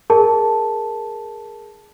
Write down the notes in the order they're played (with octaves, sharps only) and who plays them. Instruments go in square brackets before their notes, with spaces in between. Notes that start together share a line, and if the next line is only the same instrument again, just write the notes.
[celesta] G#4 A#4 A5